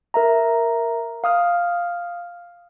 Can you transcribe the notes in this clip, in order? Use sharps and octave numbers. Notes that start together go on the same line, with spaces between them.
A#4 E5 A#5
F5 D#6 F6